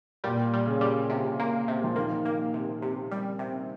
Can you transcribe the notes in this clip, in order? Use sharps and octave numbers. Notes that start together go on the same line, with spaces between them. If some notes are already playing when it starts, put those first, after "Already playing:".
A#2 G3
G3
C#3
G3
C3
A#3
C3
F3
D#3 A#3
A#3
C3
C3
G3
C3